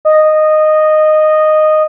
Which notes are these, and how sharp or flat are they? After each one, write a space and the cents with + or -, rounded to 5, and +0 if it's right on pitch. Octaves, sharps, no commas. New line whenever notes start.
D#5 -10